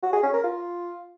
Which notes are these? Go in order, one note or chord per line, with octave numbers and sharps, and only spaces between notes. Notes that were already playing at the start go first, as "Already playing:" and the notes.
F#4
G#4
C#4
A#4
F4